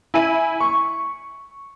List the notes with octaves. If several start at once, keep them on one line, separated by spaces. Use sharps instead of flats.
E4 G#5 D#7
C#6